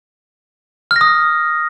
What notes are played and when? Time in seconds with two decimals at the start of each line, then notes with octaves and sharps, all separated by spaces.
0.91 F6
0.96 A#6
1.01 D#6